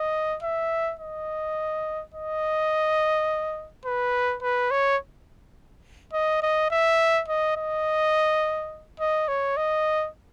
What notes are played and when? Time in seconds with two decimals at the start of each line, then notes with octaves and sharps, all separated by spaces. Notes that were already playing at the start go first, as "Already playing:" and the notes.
Already playing: D#5
0.42 E5
0.99 D#5
2.14 D#5
3.85 B4
4.42 B4
4.71 C#5
6.13 D#5
6.42 D#5
6.71 E5
7.28 D#5
7.57 D#5
9.00 D#5
9.28 C#5
9.57 D#5